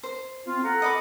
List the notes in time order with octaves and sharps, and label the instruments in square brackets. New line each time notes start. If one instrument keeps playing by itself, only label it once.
[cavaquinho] C5
[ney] C4 [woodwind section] F4
[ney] A4 [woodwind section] F#5 A#5
[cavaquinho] D#5 B5 D6